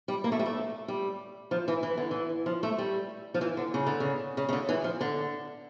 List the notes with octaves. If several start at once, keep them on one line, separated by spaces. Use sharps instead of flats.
G3
A#3
A3
G3
A3
G3
F3
E3
E3
D3
E3
F3
A3
G3
F3
E3
D3
C#3
D3
C#3
C#3
C#3
D3
E3
F3
D3